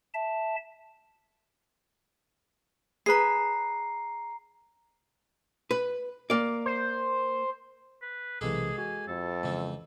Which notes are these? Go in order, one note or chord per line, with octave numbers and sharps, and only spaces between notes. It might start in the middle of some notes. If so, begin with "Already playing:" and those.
E5 A5
G#4 B4 A#5 C7
B4
A#3 D5
C5
B4
B1 C3 E3 G#3 A#3 G#4 A4
F#4 G#5
F2 A4
C#3 E3 G#3 C4